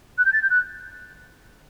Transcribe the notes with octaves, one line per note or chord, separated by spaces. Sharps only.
F#6
G6
A6
G6
F#6